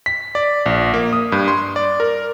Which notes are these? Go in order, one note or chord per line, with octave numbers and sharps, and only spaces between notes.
B6
D5
A#1
A#3
D#6
G2
C6
D5
A#4